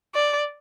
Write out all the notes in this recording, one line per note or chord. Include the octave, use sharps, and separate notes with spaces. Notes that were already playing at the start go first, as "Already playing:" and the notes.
D5